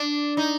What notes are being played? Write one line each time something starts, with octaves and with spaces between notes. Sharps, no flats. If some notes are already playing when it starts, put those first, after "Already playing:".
Already playing: D4
D#4